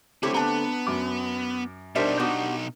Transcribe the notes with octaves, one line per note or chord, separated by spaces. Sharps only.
D3 A3 C4 D4 E4 G4 C#5
B3 D4 A#5
F#2 D6
B2 G3 D4 D#4 A#4 C5 E5
B3 F#4 G4